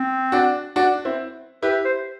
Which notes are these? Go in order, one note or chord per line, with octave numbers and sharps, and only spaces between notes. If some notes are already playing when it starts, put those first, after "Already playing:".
Already playing: C4
D4 F#4
D4 F#4
C4 E4
E4 G4 B4
C5